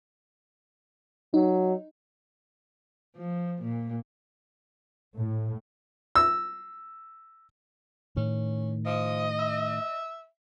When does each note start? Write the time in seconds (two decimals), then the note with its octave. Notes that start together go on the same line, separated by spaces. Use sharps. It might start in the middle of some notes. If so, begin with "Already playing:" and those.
1.34 F#3 D#4
3.16 F3
3.62 A#2
5.16 A2
6.15 E6
8.16 A2 D#3 C#4
8.86 F3 D#5
9.39 E5